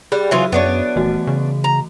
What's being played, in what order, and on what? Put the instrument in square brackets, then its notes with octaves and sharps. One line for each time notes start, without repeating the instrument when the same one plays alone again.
[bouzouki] G3 [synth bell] G#4 B5 F#6
[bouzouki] C#3 E3 F4 [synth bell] F#3 F#4 E5
[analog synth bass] F#2 [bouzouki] B3 D4 C#5
[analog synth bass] D#1 [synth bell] E3 A3 F#4
[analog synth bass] C#3
[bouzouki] A#5